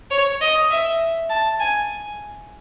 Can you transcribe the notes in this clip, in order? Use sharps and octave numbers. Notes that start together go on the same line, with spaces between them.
C#5
D#5
E5
A5
G#5